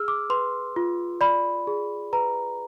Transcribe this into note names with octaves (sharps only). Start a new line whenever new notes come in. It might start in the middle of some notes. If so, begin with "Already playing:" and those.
Already playing: G#4 E6 F6
D6
B4 C6
F4
D5 B5
G#4
B4 A#5